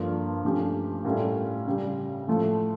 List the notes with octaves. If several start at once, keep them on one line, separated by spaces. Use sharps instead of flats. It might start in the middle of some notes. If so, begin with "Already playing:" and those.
Already playing: G2 F3 A#3 D4 A4
G2 F3 A3 C#4 G4
A2 G3 C#4 F4 A#4
C#3 G3 C#4
A2 F3 A3